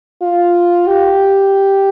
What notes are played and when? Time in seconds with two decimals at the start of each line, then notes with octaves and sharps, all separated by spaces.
0.22 F4
0.87 G4